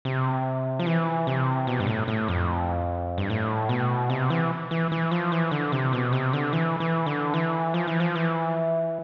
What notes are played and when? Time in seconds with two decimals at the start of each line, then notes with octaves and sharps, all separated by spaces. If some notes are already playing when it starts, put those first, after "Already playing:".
0.05 C3
0.79 F3
0.86 E3
1.27 C3
1.67 B2
1.80 G2
1.87 A2
2.08 A2
2.28 F2
3.18 G2
3.30 A2
3.69 B2
4.10 C3
4.30 E3
4.71 E3
4.92 E3
5.11 F3
5.32 E3
5.51 D3
5.72 C3
5.93 B2
6.13 C3
6.33 D3
6.53 E3
6.80 E3
7.06 D3
7.34 E3
7.74 F3
7.87 E3
8.00 F3
8.15 E3